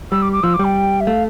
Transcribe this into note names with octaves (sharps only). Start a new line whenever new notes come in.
G3 E6
D6
D6
F3 E6
D6
G3
G5
E5
A3 F5